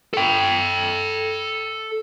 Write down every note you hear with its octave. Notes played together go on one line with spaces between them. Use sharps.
A4 G5